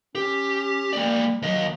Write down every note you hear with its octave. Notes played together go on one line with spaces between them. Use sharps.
C#4 G4
G#3 A#3 D5
D#2 F#3 D#5